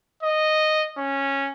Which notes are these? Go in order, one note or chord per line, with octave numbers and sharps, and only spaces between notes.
D#5
C#4